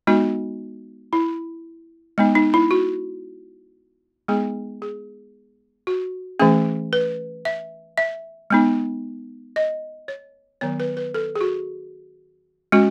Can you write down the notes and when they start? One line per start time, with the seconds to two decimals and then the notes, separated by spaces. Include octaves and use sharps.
0.07 G#3 B3 D#4 F#4
1.13 E4
2.18 G#3 B3 D#4
2.35 D#4
2.54 E4
2.71 F#4
4.28 G#3 B3 D#4 G#4
4.82 G#4
5.87 F#4
6.40 E3 A3 C#4 G#4
6.93 B4
7.45 E5
7.98 E5
8.50 G#3 B3 D#4
9.56 D#5
10.08 C#5
10.61 D#3 F#3 B3 C#5
10.80 B4
10.97 B4
11.15 A4
11.35 G#4
11.41 F#4
12.72 G#3 C#4 F#4